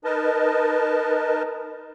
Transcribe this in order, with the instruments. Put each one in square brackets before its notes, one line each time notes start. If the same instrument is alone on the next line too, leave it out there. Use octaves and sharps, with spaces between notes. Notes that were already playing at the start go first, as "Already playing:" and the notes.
[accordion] D#4 A#4 B4 D#5 A5